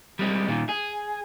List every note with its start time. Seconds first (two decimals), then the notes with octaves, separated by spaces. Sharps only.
0.19 G3 G#3 C4
0.48 A#2 D#3
0.69 G#4